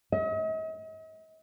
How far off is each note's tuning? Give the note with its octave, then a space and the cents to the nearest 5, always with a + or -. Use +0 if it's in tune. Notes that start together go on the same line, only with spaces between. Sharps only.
D#5 +45